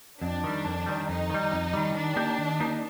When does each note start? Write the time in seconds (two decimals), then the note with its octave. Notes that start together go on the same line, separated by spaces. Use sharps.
0.21 F2 D4
0.44 D#3 G3
0.65 F2
0.86 D#3 G3
1.09 F2 D#4
1.30 D#3 G3
1.52 F2
1.73 D#3 G3
1.95 D#3 D4
2.16 A#3 D#4 G4
2.38 D#3
2.60 A#3 D#4 G4